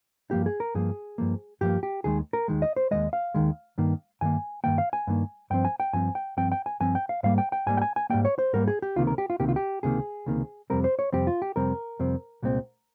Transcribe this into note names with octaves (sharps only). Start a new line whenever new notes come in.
G2 F3 A#3 G4
G#4
A#4
G2 F3 A#3 G#4
G2 F3 A#3
G2 F3 A#3 G4
G4
D#2 D#3 G#3 G#4
A#4
D#2 D#3 G#3
D#5
C5
D#2 D#3 G#3 D#5
F5
D#2 D#3 G#3
G2 D#3 A#3
G2 D#3 A#3 G#5
G2 D#3 A#3 G5
F5
G#5
G2 D#3 A#3
G2 F3 C4 G5
G#5
G5
G2 F3 C4 G#5
G5
G2 F3 C4 G5
G5
G#5
G2 F3 C4 G#5
G5
F5
G#2 G3 A#3 F5
G5
G5
G#2 G3 A#3 G#5
G5
G#5
G#5
G#2 G3 A#3 G5
C#5
C5
G#2 G3 A#3 A#4
G#4
G4
C#2 C3 D#3 A#3 F4
A#4
G4
F4
C#2 C3 D#3 A#3 G4
F4
G4
C#2 C3 D#3 A#3 G#4
C#2 C3 D#3 A#3
F2 C3 G3 C4 A#4
C5
C#5
F2 C3 G3 C4 G4
F4
G4
F2 C3 G3 C4 A#4
F2 C3 G3 C4
C2 A#2 G#3 C4